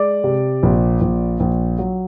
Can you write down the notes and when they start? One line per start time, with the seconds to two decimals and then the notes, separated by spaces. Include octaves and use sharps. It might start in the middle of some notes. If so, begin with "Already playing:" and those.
Already playing: G#3 D5 D6
0.24 C3
0.63 A#1
1.01 A#1
1.40 A#1
1.79 F#3